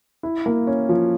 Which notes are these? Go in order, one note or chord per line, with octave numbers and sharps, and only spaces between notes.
E4
A#3
C#4
F3